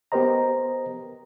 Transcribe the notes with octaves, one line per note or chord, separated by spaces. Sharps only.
B3 G4 A#4 C5 D#5 A#5